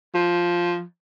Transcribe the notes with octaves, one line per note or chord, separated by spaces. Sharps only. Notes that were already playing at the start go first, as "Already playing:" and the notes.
F3